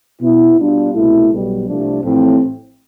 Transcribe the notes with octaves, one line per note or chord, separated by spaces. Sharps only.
B2 B3 E4
B2 G3 D4 F4
C2 B2 A3 E4
B1 B2 G3
C2 C3 F3 A3 D4
A1 A2 F3 C4